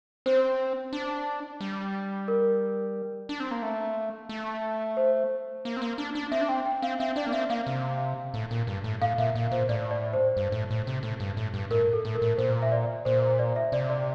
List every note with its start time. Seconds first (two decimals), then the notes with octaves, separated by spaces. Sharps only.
0.26 C4 C5
0.93 D4
1.61 G3
2.28 A#4
3.29 D4
3.40 C4
3.51 A#3
3.62 A3
4.29 A3
4.97 C5
5.65 A#3
5.77 C4
5.82 A#3
5.98 D4
6.15 D4
6.32 C4 E5
6.41 D4
6.49 C4 G5
6.65 G5
6.82 C4 F5
6.99 C4 E5
7.16 D4 D5
7.26 A#3
7.32 C4 E5
7.50 A#3 F5
7.67 C3
8.34 A2
8.51 A#2
8.67 G2
8.84 A2
9.01 A2 F5
9.18 A#2 E5
9.36 A#2
9.52 A#2 C5
9.69 A2 D5
9.91 D5
10.13 C5
10.37 G2
10.52 A2
10.70 A2
10.87 C3
11.03 A2
11.20 G2
11.37 A2
11.54 G2
11.70 A2 A#4
11.93 A4
12.05 A2
12.15 A#4
12.22 A2
12.37 A#2 C5
12.62 E5
12.72 D5
13.05 A#2 C5
13.22 C5
13.39 D5
13.56 E5
13.72 C3 D5
13.90 D5